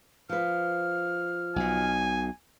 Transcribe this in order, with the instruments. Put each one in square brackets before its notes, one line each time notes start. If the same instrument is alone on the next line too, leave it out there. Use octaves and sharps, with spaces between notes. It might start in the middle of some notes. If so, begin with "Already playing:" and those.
[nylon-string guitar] F3 B4 [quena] F6
[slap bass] B1 B2 [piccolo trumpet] G#5